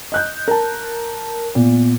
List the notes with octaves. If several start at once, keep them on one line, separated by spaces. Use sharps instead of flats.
D#5 F#6 G6
A#4 A5
A#2 B3